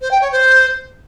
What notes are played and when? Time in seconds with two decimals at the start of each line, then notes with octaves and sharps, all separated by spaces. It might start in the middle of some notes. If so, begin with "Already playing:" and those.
0.01 C5
0.11 G5
0.21 C#5
0.32 C5